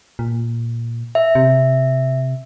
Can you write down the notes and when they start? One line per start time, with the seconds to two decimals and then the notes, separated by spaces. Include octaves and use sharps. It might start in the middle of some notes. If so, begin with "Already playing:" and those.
0.19 A#2
1.15 E5
1.35 C3